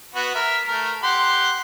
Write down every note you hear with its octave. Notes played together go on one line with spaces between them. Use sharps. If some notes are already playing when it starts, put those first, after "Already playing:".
B3 F#4
A#4 E5
A3 A#4
G4 F#5 C6